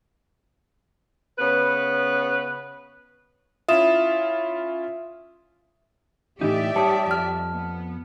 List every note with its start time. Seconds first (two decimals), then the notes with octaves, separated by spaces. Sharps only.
1.39 C#3 B3 B4
3.68 C#4 E4 F4 E5 D#6 E7
6.41 A2 E3 D#4 G4 D5 E5
6.76 G3 C#5 A5 D#6
7.06 F2 A5 F6
7.52 B3